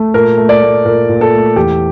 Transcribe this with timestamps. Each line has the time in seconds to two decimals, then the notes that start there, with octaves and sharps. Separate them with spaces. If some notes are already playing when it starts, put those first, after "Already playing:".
Already playing: A3
0.14 A#2 A#4
0.38 A3
0.49 D5
0.62 A3
0.85 A#2 A#4
1.09 A#2
1.21 A4
1.32 A3
1.56 E2 G4